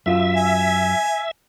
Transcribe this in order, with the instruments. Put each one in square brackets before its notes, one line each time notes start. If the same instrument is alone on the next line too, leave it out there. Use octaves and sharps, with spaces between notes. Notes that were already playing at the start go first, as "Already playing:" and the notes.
[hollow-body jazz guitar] F#2 F4 [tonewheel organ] E5
[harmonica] G#5